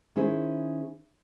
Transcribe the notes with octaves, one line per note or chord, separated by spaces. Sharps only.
D#3 C#4 E4 G#4 C5